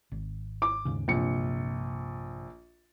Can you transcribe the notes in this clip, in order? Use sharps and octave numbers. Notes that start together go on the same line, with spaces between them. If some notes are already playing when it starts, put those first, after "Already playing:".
G#1
D6
D#2 G#2 C#3
A#1 G2 C3 C#7